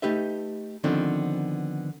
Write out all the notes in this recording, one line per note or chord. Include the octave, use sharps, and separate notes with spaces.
A3 D#4 G4 B4 E5
D3 D#3 F3 B3 C4